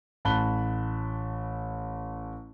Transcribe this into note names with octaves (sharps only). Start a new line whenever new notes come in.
A1 A5 B5 F#6 G7